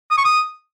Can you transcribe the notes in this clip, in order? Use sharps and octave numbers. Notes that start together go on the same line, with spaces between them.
D#6
C#6
D#6